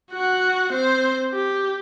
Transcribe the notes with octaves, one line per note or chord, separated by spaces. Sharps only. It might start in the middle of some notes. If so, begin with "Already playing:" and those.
F#4 F#5
C4 C5
G4